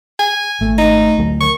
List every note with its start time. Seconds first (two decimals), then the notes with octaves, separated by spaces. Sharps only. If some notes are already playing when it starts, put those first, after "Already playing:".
0.19 G#5
0.61 G#1 A3
0.78 D#4
1.18 D2 F#3 A3
1.41 D#3 C#6